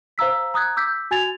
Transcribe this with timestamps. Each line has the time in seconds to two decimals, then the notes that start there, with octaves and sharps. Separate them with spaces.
0.18 C5 F5 A#5 E6 B6
0.54 A#5 D#6 F#6 G#6
0.76 D6 E6 G6 B6
1.11 F#4 G#5 G#6 A6 F7